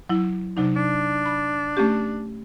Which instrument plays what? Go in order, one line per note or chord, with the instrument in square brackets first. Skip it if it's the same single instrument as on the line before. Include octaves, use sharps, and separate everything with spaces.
[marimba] F#3 E4
[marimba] C3 F#3 D#4 [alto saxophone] D4
[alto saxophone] D4
[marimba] B5
A3 C#4 G4